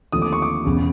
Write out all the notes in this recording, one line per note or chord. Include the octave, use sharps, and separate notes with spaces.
D#2 D3 F3 A3 C4 D#6
D6
C#6
D6
E1 E2 C#3